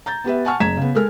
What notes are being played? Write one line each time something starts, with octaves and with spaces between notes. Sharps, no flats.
A#5 G6 A6
B3 G4 B4 E5
F#5 G#5 A5 C#6 F6
F#1 A#5 G#6 B6 E7
C#3 B3
G#3 A4 A#4 F6